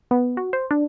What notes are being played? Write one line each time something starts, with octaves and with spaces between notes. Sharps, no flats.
B3
F#4
C5
D4